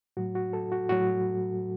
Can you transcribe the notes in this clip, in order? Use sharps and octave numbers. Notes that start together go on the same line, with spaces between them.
A2 F#3 F#4
F#4
A4
F#4
A2 F#3 F#4